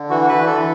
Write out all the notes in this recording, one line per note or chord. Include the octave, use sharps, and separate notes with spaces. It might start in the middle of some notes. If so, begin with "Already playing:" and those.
Already playing: D3
E3 F#4
B4
E3
A4
E3